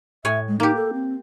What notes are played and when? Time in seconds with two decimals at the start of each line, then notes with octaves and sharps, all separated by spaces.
0.25 A2 C#5 E5 G#5
0.48 G#3
0.60 A#3 D#4 G4
0.76 A4
0.93 C4